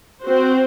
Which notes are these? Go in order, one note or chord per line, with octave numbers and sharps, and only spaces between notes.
C4 F#4 C5